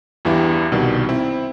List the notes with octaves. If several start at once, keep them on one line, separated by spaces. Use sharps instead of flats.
E2 G2 E3 E4 G4 F5
C2 B2 D#3 G3
C4 E4